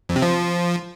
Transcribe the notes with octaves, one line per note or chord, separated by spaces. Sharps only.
F2
C3
F3